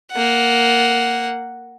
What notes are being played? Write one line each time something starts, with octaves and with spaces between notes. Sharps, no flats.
A#3 F#5